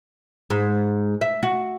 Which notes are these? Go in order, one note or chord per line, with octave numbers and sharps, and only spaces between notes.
G#2
E5
F#4